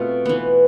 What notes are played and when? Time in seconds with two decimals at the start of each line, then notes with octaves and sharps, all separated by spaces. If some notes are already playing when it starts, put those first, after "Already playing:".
Already playing: B2 A3 C4 F4
0.26 E3 B3